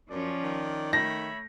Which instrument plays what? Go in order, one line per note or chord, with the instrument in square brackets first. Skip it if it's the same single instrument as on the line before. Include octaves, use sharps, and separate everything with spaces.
[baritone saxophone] F#2 [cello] F3 C#4 [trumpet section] C#5 D5
[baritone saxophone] D#3
[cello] A3 [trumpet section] C#5 E5 B5 [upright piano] A#6